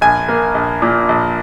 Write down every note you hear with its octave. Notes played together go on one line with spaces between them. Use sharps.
A#1 G#5
A#3
A#1
A#2
A#1